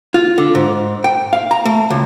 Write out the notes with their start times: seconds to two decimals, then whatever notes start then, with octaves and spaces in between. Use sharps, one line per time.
0.14 F4
0.38 D3
0.55 G#2
1.04 G5
1.33 F5
1.51 A#5
1.65 A3
1.90 C#2